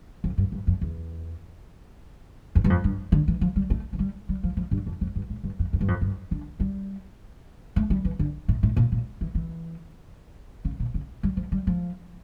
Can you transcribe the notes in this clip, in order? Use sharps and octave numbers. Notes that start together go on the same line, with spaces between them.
F2
G2
G2
F2
E2
E2
G2
F2
G2
D3
E3
F3
G3
A3
F3
G3
G3
F3
F3
G2
F2
F2
G2
A2
G2
F2
E2
G2
F2
G2
D3
G3
A3
G3
E3
D3
A2
A2
A#2
A#2
E3
E3
C#3
A#2
C#3
G3
F3
G3
F3